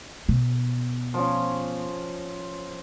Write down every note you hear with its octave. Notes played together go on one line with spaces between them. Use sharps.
B2
F3 C#4